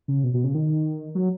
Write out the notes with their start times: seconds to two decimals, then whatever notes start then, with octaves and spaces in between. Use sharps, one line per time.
0.08 C#3
0.24 B2
0.34 B2
0.44 C#3
0.54 D#3
1.15 F#3